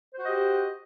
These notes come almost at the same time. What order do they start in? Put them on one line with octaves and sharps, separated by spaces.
C5 F#4 D#5 G4